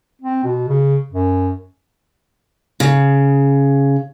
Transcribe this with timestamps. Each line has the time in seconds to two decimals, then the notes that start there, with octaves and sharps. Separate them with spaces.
0.22 C4
0.44 B2
0.68 C#3
1.11 F#2
2.80 C#3